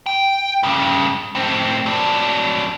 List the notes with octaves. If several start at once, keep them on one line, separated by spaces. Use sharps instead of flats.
G5
G2 C#3
A2 C4
F#3 D4